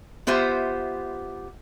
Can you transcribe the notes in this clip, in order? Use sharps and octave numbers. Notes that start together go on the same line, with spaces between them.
B3 F4 G4 C5 E5